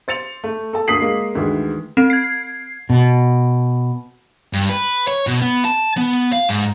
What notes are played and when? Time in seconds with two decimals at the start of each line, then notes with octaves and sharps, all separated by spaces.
0.08 C5 A6 C#7 F7
0.44 A3
0.73 A4 A5
0.88 D2 A#3 D#6 B6 C7 F#7
1.01 G#3 A#3
1.35 D2 D#3 E3 G#3
1.97 C4
2.10 G#6 C7
2.90 B2
4.53 G2
4.69 B4
5.08 C#5
5.27 B2
5.42 B3
5.65 A5
5.97 B3
6.33 F5
6.49 G#2